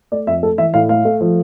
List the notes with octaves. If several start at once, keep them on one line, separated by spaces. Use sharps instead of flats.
A3 D5
F2 E5
A3 A4
E3 E5
A2 F5
A3 F5
A3
F3